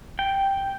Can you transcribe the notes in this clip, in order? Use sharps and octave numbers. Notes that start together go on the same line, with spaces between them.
G5